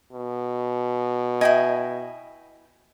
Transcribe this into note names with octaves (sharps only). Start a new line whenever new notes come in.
B2
E4 D#5 G5 G#5